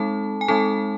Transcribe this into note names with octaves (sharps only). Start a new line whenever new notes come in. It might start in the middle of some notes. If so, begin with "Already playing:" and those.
Already playing: G#3 C4 D#4 A4 A5
G#5
G#3 C4 D#4 A4 A5